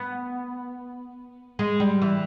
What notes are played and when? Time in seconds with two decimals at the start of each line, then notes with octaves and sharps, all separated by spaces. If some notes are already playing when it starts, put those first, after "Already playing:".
Already playing: B3
1.59 G#3
1.80 G3
2.02 E3